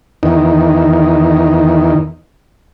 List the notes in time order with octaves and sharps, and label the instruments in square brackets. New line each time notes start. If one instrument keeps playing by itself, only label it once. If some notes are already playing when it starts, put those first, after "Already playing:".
[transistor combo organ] E2 D#3